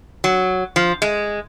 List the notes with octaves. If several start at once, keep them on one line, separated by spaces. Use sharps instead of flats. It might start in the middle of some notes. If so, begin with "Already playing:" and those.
F#3
F3
G#3